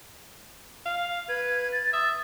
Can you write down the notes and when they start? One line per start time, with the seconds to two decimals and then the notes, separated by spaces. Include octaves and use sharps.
0.86 F5
1.29 B4 G#6
1.73 A6
1.93 E5 D#6